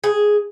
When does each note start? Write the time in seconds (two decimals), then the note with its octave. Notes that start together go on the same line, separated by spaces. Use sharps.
0.04 G#4